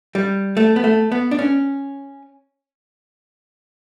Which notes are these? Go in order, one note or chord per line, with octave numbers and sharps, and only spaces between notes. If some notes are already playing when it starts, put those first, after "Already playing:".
G3
A3
B3
A3
B3
D4
C#4